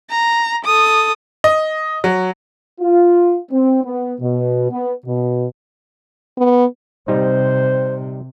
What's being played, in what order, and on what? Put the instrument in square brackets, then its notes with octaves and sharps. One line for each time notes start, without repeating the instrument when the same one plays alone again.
[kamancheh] A#5
A4 D#6
[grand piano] D#5
F#3
[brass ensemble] F4
C4
B3
B2
B3
B2
[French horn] B3
[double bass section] C3 [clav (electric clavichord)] G3 D#4 [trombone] C5